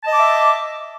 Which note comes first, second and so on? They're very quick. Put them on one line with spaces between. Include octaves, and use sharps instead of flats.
A5 D#5 D6 E5